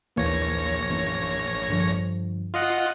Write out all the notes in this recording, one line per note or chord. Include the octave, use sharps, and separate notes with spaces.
A#1 D#2 E3 A#3 C#5 A#6
F#2 E3 A#3
G2 D3 F3
F4 D#5 F#5 C7